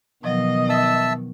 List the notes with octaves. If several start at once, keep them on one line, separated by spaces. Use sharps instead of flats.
B2 D#3 F3 F#3 D#5
E5 A5 E6